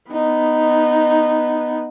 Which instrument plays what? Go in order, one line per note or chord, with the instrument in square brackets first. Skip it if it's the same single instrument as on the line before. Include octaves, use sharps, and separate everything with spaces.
[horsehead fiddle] B3 D#4